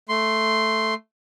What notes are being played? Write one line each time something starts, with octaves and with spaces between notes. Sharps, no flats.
A3 C6